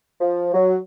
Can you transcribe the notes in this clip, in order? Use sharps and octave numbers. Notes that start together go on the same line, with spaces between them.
F3
F#3